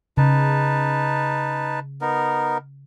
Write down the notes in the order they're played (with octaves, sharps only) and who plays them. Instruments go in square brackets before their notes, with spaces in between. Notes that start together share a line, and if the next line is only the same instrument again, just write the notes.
[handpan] C#3 [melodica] D#4 B4 A5
[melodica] B3 D#4 A#4